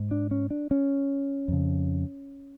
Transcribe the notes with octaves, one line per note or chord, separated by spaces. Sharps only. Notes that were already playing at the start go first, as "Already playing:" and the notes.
Already playing: G#2
D4
C#4
D4
C#4
F2 C#3